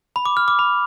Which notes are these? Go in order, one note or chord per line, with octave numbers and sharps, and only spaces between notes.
B5
D6
F6
D6
B5